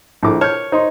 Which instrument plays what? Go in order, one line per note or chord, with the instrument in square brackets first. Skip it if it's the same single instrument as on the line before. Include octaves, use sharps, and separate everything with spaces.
[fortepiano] A#1 D6 [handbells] D4 E4 A4
[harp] C#5 [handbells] A5 G6 [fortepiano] F6
[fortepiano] D#4 [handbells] C5 D#5 C6